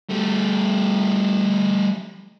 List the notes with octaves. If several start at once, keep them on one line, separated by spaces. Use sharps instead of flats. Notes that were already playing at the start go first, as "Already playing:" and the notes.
G3 A3